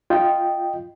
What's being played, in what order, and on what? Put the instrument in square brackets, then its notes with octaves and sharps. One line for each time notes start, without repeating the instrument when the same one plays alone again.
[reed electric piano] F4 D#5 G5